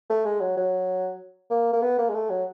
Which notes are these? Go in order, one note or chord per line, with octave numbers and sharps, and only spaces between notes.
A3
G#3
F#3
F#3
A#3
A#3
B3
A#3
G#3
A3
F#3